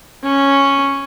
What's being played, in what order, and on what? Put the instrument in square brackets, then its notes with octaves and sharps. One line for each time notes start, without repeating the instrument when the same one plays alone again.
[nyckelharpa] C#4